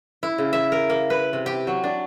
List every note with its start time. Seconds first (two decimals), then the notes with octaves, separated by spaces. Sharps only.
0.23 E4
0.38 C#3
0.53 E5
0.72 A#4
0.90 A#3
1.10 B4
1.33 C3
1.46 G4
1.67 F#3
1.84 D4